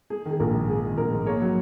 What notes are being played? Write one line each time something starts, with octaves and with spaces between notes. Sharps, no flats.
G#3 G#4
D#3 G#4
A#1 A#4
G#2
G#3 G#4
D#3
A#1 A#4
G#2
A#3 G#4 C#5
F#3